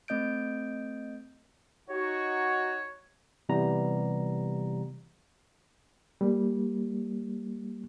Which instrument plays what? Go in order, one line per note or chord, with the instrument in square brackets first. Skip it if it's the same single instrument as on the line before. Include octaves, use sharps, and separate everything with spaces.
[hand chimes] A3 C4 D#5 G6 D7
[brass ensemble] D#4 F#4 [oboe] C#5
[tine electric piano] C3 E3 G3 B3 A#5
[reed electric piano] G3 A#3